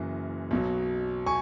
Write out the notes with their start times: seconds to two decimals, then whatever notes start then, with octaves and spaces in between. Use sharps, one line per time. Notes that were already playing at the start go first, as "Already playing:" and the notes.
Already playing: F#1 F#2 E3
0.51 B1 B2 F#3
1.26 G#5 C#6